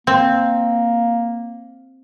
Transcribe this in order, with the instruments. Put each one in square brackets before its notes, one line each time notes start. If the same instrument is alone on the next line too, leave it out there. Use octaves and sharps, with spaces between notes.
[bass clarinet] A#3 [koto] C4